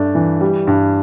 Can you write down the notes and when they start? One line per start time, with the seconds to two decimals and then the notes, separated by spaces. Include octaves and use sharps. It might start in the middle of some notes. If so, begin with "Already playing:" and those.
Already playing: G2 A3 D4
0.15 E3
0.41 G3
0.67 G2